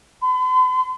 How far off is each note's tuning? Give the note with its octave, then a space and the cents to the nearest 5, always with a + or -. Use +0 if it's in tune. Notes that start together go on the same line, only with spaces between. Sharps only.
B5 +45